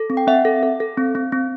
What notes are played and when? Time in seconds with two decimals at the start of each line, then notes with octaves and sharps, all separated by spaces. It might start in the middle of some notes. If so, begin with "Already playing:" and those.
Already playing: A4
0.10 C4
0.17 G5
0.27 C4 E5 F#5
0.45 A4
0.63 A4
0.80 A4
0.98 C4
1.15 C4
1.32 C4